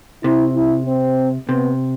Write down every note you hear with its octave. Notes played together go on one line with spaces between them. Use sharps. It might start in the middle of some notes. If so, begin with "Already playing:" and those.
C3 E4
E4
C4
C3 B3